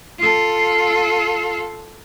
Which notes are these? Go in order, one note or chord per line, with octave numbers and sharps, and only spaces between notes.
F4 A4